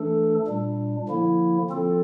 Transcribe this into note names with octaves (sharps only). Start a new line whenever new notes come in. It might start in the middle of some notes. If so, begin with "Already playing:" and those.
Already playing: E3 A3 D4 A4
A#2 G3 D4
D3 F3 A#3 E4
F3 C4 F4 A4